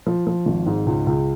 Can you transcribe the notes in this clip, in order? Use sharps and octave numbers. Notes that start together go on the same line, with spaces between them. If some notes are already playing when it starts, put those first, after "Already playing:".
F3
F3
G#1
G#2
C#2
C#2